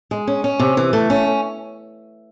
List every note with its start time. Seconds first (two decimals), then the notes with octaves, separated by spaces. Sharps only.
0.11 G#3
0.27 C#4
0.44 C#4
0.59 C3
0.77 E3
0.93 A3
1.10 C#4